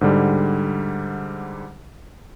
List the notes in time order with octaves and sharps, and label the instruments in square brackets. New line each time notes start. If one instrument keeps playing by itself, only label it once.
[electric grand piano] G#2 D3 G3